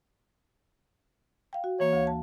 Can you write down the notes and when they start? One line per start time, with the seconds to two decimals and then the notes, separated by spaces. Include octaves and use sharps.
1.53 F5 G5
1.64 F#4
1.80 E3 A#3 C#5
1.93 D2 F5
2.07 A5